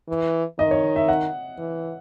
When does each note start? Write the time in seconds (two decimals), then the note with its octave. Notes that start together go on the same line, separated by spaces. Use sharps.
0.09 E3
0.59 D#3 D#5
0.71 C#5
0.96 E5
1.08 F#5
1.58 E3